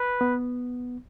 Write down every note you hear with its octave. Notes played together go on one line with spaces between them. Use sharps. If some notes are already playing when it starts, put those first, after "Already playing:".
Already playing: B4
B3